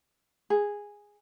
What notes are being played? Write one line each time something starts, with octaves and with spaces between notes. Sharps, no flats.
G#4